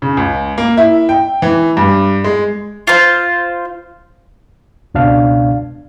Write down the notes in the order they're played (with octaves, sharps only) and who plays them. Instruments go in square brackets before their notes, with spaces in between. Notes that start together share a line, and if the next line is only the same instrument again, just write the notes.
[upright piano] C#3
C#2
A#3
E4
G5
E3
G2
G#3
[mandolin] F4 C5
[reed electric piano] C#2 B2 D4 F5